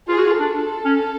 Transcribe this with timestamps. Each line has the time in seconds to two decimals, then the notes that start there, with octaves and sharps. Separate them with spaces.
0.08 F4 G#4
0.18 F#4
0.27 F4
0.39 D4 A4
0.85 C#4